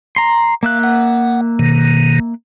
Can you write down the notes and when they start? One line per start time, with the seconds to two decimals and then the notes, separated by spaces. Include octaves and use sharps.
0.16 A#5 C6
0.63 A#3 E5 F5 F#6
0.83 F#5
1.59 B2 D#3